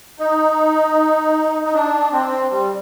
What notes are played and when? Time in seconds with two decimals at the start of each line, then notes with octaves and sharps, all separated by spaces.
0.19 D#4
1.65 D#4
1.74 D4
2.12 C4
2.51 G3